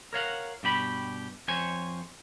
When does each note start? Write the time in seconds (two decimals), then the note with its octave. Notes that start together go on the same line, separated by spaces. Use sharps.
0.13 A#4 C#5 F5 F#5
0.63 G2 B2 G4 B5
1.48 F2 C5 C#5 G#5